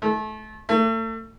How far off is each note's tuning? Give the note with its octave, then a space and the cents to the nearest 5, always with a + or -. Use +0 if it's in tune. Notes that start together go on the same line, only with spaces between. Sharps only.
A3 -30
A3 +35